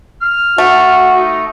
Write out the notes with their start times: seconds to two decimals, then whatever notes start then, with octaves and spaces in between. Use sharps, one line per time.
0.22 F6
0.58 A3 F#4
1.15 D#4